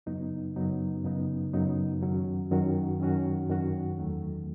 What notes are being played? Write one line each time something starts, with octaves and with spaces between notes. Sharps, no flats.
F#2 C#3 F#3 B3 D#4
F#2 C#3 F#3 B3 D#4
F#2 C#3 F#3 B3 D#4
F#2 C#3 F#3 B3 D#4
F#2 D#3 F#3 C#4 F#4
F#2 D#3 F#3 C#4 F#4
F#2 D#3 F#3 C#4 F#4
F#2 D#3 F#3 C#4 F#4
E2 D#3 F#3 A3